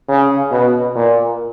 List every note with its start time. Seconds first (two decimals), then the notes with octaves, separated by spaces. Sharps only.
0.09 C#3
0.52 B2
0.95 A#2